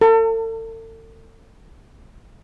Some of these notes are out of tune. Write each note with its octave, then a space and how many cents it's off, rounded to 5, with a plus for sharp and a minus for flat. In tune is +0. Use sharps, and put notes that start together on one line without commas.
A4 +40